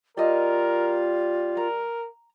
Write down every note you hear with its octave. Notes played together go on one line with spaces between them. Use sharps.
G3 F4 A#4 D5 D#5
A#4 A#5